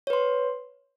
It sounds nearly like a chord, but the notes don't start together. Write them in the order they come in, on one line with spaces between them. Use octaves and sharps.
C#5 B4 C6